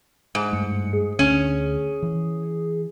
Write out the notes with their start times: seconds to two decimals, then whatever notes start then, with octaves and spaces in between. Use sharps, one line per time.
0.35 G#2
0.53 G2 A3 C#7
0.93 G#4
1.19 D2 C#4
2.03 E3